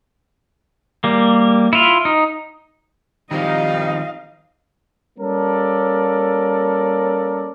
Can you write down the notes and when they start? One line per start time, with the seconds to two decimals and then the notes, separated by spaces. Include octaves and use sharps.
1.04 G3 A#3
1.73 E4 F4
2.05 D#4
3.31 D#3 F3 G3 C4 D#4 D#5 F5
5.19 G3 A#3 C#4 A4 A#4 D5